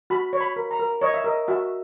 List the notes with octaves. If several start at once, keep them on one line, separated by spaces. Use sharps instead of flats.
F#4 B5
C#5
B5
A#4
A#5
A#4
C#5 D#5
E5
A#4 D#5
F#4 E5